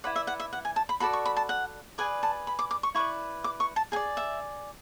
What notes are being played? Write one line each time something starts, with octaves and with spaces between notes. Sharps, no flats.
E4 B4 D5 F#5
E5
F#5
E5
F#5
G#5
A5
B5
F#4 A4 D5 B5
C#6
B5
A5
F#5
G#4 B4 D5 G#5
A5
B5
D6
D6
C#6
E4 B4 D5 C#6
D6
C#6
A5
G#4 D5 G#5
E5